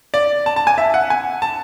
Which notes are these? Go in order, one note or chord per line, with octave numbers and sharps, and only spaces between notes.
D5
A5
A5
G#5
E5
F#5
G#5
A5